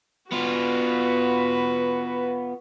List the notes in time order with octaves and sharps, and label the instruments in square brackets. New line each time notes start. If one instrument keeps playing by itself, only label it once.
[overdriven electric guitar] B3 F4 [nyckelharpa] F#4 B4